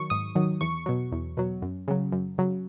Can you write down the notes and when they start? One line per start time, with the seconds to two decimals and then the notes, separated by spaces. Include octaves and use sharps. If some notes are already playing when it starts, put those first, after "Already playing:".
Already playing: D#3 F#3 C#6
0.10 G#2 D#6
0.35 D#3 F#3
0.61 E2 C#6
0.86 B2 F#3
1.12 E2
1.37 B2 F#3
1.62 F#2
1.88 C#3 F#3
2.12 F#2
2.38 C#3 F#3